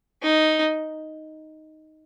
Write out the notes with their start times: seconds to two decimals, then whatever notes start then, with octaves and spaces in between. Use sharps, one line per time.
0.22 D#4